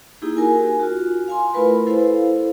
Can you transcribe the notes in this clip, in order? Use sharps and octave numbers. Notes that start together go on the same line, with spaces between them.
A#3 D#4 E4 G4 G#4
F#4 A#4 G#5
F4 F#4
F5 G#5 C6
A3 E4 F4 A#4 B4 B5
E4 A4 C5 F5